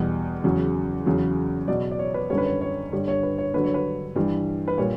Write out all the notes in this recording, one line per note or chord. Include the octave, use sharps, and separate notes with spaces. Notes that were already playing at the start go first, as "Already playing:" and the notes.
Already playing: E2 B2 G3
E2 C#3 F#3
E2 C#3 F#3
B2 F#3 D5
D5
C#5
B4
F#2 D3 G3 C#5
B4
C#5
C#5
G2 D3 G3 C#5
C#5
B4
C#5
G2 D3 F#3 B4
C#5
B4
G2 E3 G3
B4
A#2 G3 C#5